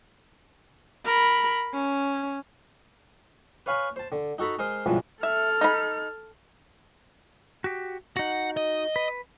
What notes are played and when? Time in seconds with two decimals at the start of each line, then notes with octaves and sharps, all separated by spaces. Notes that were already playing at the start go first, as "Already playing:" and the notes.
1.05 A#4 B5
1.74 C#4
3.66 B4 C#5 F5 G#5 B5
3.96 C5 A5
4.12 D3
4.38 D#4 F#4 A4 A#5 B5
4.59 G#3 A#4 C5 C6 D#6
4.86 C#2 G2 B2 E3 F3
5.23 A4 E5 F6
5.61 D#4 B5
7.64 F#4 G4
8.17 D#4 F#4 F#5
8.57 D#5
8.96 B4